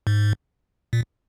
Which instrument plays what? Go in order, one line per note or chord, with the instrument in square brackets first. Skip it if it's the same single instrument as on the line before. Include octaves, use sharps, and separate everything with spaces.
[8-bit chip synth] G#2
A#2